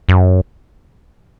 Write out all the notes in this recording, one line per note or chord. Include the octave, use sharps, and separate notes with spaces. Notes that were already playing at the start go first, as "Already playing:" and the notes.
F#2